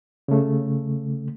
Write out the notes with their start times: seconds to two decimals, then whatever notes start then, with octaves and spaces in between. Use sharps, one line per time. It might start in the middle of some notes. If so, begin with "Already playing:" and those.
0.28 C#3 A3